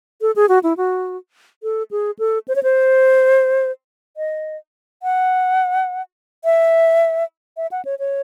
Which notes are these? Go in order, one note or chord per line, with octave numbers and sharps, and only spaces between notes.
A4
G#4
F#4
E4
F#4
A4
G#4
A4
C5
C#5
C5
D#5
F#5
E5
E5
F#5
C#5
C#5